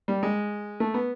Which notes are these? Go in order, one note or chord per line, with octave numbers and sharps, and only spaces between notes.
G3
G#3
A3
B3